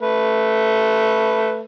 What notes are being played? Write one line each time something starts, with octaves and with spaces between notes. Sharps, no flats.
A3 B4